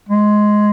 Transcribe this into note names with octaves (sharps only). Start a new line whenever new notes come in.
G#3